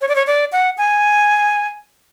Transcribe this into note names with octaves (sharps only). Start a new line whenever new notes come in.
C#5
D5
C#5
D5
F#5
G#5